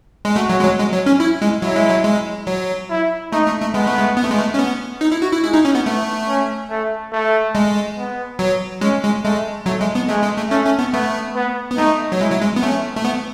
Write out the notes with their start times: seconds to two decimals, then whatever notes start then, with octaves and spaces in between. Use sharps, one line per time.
0.25 G#3
0.36 A3 F#4
0.49 F#3
0.60 G#3
0.64 F#3
0.79 G#3
0.93 F#3
1.06 C#4
1.20 E4
1.42 G#3
1.62 F#3 E4
1.76 G#3
1.90 F#3
2.05 G#3
2.47 F#3
2.90 E4
3.32 A3 D#4
3.46 A3
3.61 A3
3.74 G#3 B3
3.86 A3
3.97 G#3
4.17 B3
4.23 A3
4.31 G#3
4.39 A3
4.54 C#4
4.59 B3
5.01 D#4
5.12 E4
5.22 F#4
5.32 E4
5.43 G#3 E4
5.53 D#4
5.65 C#4
5.75 B3
5.86 A3 B3
6.28 C#4
6.70 A3
7.12 A3
7.55 G#3
7.98 B3
8.39 F#3
8.81 G#3 C#4
9.03 G#3
9.24 G#3 A3
9.66 F#3 A3
9.81 G#3
9.95 B3
10.08 G#3 A3
10.23 G#3
10.37 A3
10.50 A3 C#4
10.65 C#4
10.79 B3
10.93 A3 B3
11.35 B3
11.71 B3
11.78 A3 D#4
12.12 F#3
12.20 G#3 E4
12.31 F#3
12.42 G#3
12.56 B3
12.63 A3 C#4
12.96 A3
13.05 B3